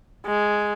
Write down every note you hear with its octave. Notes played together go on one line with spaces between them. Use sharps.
G#3